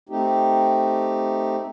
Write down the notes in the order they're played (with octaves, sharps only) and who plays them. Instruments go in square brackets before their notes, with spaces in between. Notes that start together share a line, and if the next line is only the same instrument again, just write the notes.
[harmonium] A3 C4 D#4 G4